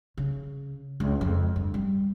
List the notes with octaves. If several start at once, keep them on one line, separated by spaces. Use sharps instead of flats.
C#3
C#2
F2
G2
G3